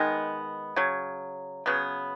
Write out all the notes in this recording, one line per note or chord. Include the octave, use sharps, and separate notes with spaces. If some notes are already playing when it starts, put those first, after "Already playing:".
Already playing: D#3 G#3 B3
C#3 F#3
C#3 F#3 B3